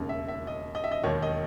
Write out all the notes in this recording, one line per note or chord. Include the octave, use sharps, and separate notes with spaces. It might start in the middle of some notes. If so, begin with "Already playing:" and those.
Already playing: E1 D#2 C#3
E5
E5
D#5
D#5
E5
D#5
E1 D#2 D#3 C#5
D#5